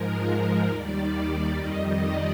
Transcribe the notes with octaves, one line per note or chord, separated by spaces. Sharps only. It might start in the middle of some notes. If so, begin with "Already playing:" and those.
Already playing: G#2 F3 G#3 A#4
D#2 D#3 G3 D5
F2 D#3 G3 D#5
D5